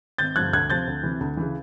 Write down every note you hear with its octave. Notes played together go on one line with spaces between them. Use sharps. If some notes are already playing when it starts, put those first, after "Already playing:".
G#1 G6 A6
G2 D3 F3 F#6 G#6
D2 F#6 G#6
C3 F3 G6 A6
D2
C3 E3
D2
C#3 E3